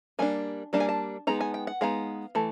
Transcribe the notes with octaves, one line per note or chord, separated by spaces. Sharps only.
G3 A#3 D4 G#5
G3 A#3 D4 A5
G#5
A5
G#3 B3 D#4 A#5
G#5
G5
F#5
G#3 B3 D#4 F5
E3 A3